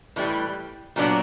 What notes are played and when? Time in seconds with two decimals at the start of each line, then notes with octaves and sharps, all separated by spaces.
0.16 A2 E3 G3
0.96 A#2 F#3 B3 D4